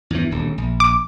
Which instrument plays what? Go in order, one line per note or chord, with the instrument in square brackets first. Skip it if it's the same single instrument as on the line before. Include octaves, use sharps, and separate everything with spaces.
[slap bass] E2 G2 E3
D#1 D2
A#1
[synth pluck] D6